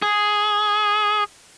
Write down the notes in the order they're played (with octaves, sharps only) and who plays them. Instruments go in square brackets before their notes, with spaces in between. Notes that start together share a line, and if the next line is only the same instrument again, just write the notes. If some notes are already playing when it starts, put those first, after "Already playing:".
[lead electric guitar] G#4